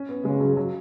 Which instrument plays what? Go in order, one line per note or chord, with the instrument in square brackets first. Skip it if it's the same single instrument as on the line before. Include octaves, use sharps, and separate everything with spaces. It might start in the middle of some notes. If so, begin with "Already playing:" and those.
Already playing: [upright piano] C#4
B3
[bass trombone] C#3 [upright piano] G#3
[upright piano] F#3
F#3